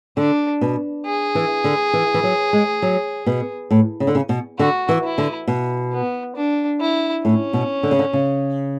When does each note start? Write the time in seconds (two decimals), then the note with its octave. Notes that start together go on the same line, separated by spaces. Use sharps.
0.17 D3 D4
0.61 B2
1.06 G#4
1.35 E3
1.64 D3
1.93 E3
2.14 E3
2.23 F#3
2.53 G#3
2.82 F#3
3.26 B2
3.71 A2
4.00 C#3
4.07 D3
4.15 C#3
4.29 B2
4.59 D3 F#4
4.89 E3
5.04 E4
5.18 D3
5.48 B2
5.92 B3
6.35 D4
6.81 E4
7.25 A2 C#4
7.53 B2
7.83 D3
7.91 C#3
7.99 D3
8.13 C#3